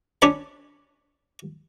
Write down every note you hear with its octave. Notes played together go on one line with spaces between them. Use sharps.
C#4 D4 C#5 D5 B5